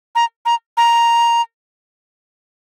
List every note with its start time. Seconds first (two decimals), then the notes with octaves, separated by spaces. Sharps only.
0.15 A#5
0.46 A#5
0.77 A#5